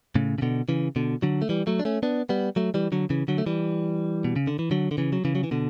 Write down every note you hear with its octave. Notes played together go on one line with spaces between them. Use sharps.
A2 C#3
C#3
B2 D3
C#3 E3
B2 D3
D3 F#3
A3
E3 G3
F#3 A3
D4
A3 C#4
B3 D4
G3 B3
F#3 A3
E3 G3
D3 F#3
C#3 E3
D3 F#3
A3
E3 G3
B2
C#3
D3
E3
D3 F#3
D3
C#3 E3
F#3
C#3 E3
F#3
E3
B2 D3